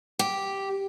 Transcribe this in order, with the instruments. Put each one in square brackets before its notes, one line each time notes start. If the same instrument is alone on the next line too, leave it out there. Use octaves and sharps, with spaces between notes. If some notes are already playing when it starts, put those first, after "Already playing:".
[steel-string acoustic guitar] G4